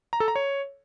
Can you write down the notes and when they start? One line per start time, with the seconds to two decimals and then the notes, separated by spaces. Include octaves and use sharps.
0.13 A#5
0.20 A4
0.28 A#5
0.36 C#5